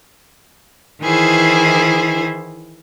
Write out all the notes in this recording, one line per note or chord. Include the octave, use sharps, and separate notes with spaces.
D#3 E3 E4 G#4 C5